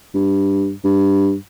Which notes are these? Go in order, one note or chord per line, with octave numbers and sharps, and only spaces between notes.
G2
G2